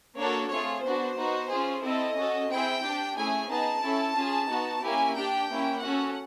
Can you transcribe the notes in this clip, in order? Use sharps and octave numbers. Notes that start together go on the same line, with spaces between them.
A#3 D4 F#4 A4 C#5
A3 C4 F4 G#4 C#5
B3 D4 F#4 C5
B3 D#4 F#4
C#4 F4 G#4
C4 E4 A4 D#5
C#4 F#4 A4
C4 E4 G#4 G5
D4 G4
A3 C#4 E4 G#4 G#5
B3 D#4 G#4 A5
C#4 E4 A4
C#4 F4 G#4
B3 D#4 F#4
A#3 C#4 E4 G4 G#5
D4 G4 G5
A#3 C#4 E4
C#4 F#4 A4 F#5